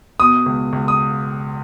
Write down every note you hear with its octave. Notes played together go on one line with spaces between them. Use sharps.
B2 D#6
C#2
C#2
D#6